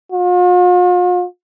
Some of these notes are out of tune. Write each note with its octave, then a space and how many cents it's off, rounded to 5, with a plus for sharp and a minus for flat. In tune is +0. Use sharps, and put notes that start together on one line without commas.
F4 +45